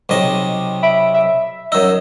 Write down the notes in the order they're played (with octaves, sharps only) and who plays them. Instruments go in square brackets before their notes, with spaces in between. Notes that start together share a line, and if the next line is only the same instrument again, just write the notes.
[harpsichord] B1 C3 D#5
[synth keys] E5 B5 D7
E5
[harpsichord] F#2 D#4 [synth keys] E6